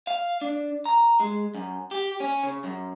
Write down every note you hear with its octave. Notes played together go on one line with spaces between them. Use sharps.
F5
D4
A#5
G#3
F#2
G4
C#4
C#3
F#2